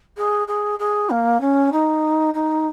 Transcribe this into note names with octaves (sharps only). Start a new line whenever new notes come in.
G#4
G#4
G#4
A#3
C#4
D#4
D#4